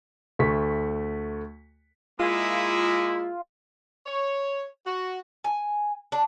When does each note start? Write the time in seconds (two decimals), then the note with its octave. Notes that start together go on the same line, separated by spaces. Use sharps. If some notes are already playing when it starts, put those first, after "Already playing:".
0.39 D2 A3 C#6 B6
2.20 G#3 A#3 E4 F4
4.06 C#5
4.86 F#4
5.44 G#5
6.12 D4